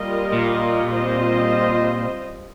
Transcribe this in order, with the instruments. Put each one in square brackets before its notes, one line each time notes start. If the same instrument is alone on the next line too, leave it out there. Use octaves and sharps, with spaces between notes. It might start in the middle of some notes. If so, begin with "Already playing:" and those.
Already playing: [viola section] G3 A#3 F4 A#4 D#5
[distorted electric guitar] A#2
[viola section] G3 C4 F4 C5 D#5